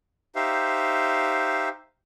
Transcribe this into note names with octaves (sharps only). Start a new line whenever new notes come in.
D#4 G4 C5 E5 F5